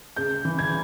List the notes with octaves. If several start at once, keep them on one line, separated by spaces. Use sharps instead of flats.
C#3 G6
E3
G#6